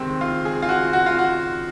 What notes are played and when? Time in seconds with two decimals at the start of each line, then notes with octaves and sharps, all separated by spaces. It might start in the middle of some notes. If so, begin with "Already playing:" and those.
Already playing: C#2 C3 D#3 G#3 C4
0.21 F4
0.45 G#4
0.62 F4
0.69 F#4
0.93 F#4
1.06 F4
1.19 F#4